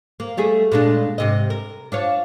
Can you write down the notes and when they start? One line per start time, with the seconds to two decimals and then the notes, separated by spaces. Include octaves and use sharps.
0.20 A#3
0.37 G3 A3 G#4
0.72 A#2 G#3 D4
1.18 G#2 C3 D#5
1.50 A#4
1.92 D4 F4 C#5